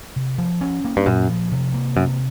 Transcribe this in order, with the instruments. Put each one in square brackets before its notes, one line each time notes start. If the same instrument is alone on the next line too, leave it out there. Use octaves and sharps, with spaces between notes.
[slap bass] C3
F3
C#4
A#3
[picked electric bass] G2
[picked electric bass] F#2 [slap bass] A#2
[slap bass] F3
C3
A#3
[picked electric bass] F#2 [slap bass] C3